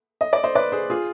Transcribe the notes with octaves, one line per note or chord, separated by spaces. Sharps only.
D#5
D5
C5 D#5
B4 D5
G#4 C5
F4 G#4